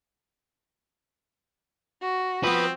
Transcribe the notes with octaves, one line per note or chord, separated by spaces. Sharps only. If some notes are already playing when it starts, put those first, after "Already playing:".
F#4
F3 B3 C4 B4